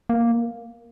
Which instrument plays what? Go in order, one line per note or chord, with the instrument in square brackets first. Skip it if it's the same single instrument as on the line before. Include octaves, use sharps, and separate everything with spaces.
[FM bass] A#3